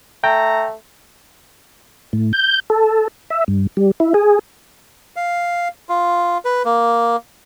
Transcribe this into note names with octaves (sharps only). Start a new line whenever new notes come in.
A3 G5 A#5
A2
G6
A4
E5
G2
G3
E4
G#4
F5
F4
B4
A#3